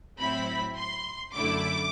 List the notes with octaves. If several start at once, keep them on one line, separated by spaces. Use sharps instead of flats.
A2 F#3 C4 E4 B5
C6
F#2 D3 A3 E4 D6